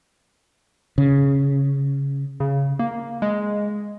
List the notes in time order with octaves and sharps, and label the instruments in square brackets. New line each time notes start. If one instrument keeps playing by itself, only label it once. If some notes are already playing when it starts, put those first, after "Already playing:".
[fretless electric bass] C#3
[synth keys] C#3
A#3
G#3